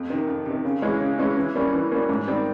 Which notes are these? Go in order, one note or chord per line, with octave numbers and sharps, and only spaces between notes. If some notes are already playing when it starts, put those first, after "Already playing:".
Already playing: F2
C3 D#3
F2
C3 D#3
C#3
E3 G#3 C#4
C#3
E3 G#3 C#4
E3
G3 A#3 C#4
E3
G3 A#3 C#4
G#2
D#3 G3 C4